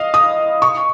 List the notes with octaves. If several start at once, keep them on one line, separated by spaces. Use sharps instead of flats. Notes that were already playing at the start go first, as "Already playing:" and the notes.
Already playing: D#5 F5
D#6
C#6